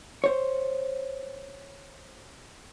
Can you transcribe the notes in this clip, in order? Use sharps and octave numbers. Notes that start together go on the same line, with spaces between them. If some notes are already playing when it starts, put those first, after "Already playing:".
C5 C#5